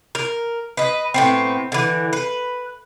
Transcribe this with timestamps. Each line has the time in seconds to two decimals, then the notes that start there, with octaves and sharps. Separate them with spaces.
0.15 A#4
0.77 B4 D#5
1.14 A2 B3 C4
1.72 D3 E3
2.13 B4